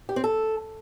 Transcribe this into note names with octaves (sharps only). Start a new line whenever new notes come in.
G4
C4
A4